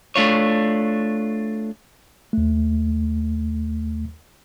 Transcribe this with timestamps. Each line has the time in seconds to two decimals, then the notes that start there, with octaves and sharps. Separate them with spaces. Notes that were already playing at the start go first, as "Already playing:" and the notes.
0.16 A3 D4 F4 C#5
2.33 D#2 A3